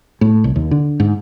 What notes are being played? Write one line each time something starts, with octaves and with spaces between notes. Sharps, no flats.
A2
C2
D#2
D3
G#2